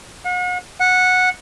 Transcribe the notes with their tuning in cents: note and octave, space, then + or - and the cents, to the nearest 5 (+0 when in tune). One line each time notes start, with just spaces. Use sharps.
F#5 -40
F#5 -10